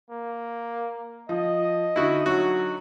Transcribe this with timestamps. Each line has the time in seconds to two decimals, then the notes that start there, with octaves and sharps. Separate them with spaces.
0.10 A#3
1.29 F3 D#5
1.96 D3 D#4 E4 F#4
2.26 F#3 F#4